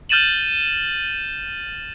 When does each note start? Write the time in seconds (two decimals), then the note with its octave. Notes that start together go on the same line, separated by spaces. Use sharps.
0.09 F6 G6 A6 D#7 E7 F#7